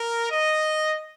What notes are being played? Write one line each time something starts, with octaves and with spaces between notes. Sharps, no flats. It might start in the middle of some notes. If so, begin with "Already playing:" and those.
Already playing: A#4
D#5